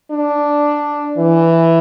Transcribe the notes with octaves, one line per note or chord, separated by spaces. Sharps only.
D4
E3